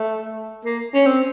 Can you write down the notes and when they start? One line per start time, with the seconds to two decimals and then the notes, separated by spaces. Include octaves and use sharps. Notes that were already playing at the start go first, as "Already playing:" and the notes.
Already playing: A3
0.64 A#3
0.94 C#4
1.06 C4